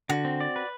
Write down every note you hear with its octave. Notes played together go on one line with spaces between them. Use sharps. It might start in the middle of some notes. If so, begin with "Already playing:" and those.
D3 F#4
C4
D5
B4